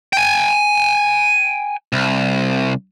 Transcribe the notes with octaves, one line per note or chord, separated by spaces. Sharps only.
G5 G#5
C2